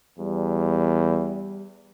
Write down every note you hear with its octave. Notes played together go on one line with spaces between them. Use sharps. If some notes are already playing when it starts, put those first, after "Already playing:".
E2 G3